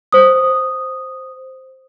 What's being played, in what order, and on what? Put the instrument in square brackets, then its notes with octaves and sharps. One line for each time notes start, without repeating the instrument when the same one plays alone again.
[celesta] C5 D#6